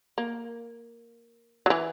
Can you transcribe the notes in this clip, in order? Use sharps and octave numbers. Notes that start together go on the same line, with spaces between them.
A#3
F#3
E3